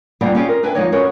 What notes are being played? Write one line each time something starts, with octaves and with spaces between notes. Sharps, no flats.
G3 A#3 B3 D4 F4 G#4
C#4 F4 G4 G#4 D5 F5
G#4 A#4
D4 B4 E5 G5 G#5
F3 G#3 D#4 C#5 D5
C#4 F#4 G#4 A#4 B4 C#5